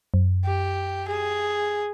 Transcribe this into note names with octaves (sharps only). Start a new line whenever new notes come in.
F#2
G4
G#4